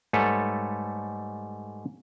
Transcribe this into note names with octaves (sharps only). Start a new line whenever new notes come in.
G#2 G3 A3 A4 B4 C#5